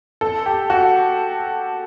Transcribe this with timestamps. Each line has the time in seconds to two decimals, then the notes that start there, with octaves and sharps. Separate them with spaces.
0.21 A4
0.46 G4
0.70 F#4